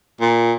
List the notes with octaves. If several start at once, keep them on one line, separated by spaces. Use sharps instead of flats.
A#2